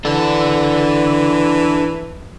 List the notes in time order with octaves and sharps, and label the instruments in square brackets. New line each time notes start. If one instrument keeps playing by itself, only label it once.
[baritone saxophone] E3 [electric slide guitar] D4 A4